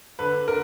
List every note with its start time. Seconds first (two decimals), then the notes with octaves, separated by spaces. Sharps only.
0.19 D3 B4
0.48 D3 A#4